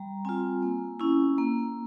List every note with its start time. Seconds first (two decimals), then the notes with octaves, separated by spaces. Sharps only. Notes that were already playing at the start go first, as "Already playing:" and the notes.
Already playing: G3 A#5
0.25 C4 F4 G#5
0.62 A#3
1.00 C#4 E4
1.38 A#3